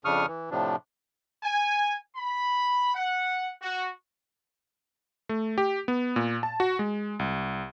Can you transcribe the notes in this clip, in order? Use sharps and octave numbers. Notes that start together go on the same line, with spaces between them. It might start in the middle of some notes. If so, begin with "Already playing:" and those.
F2 C#3 D4 C#6 D#6 F6
E3
A2 C3 F3 D4
G#5
B5
F#5
F#4
A3
G4
B3
A#2
A5
F#4
G#3
C2